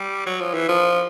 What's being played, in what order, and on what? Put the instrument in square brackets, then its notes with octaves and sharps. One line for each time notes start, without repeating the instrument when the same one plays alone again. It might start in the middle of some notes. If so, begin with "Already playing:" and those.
Already playing: [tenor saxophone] G3
F#3
F3
E3
F3